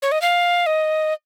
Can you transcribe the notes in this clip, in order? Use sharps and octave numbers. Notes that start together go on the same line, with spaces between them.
C#5
D#5
F5
D#5